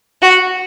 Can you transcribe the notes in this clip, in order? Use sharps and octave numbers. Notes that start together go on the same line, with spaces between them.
F#4